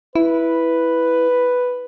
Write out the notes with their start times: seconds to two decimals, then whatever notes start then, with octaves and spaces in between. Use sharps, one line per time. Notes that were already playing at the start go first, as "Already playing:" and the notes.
0.15 E4 B4